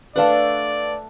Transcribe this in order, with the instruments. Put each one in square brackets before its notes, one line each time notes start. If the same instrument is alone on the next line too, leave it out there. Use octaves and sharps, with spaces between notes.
[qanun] A3 D4 F#5 [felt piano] B4 F5 A5 [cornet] D5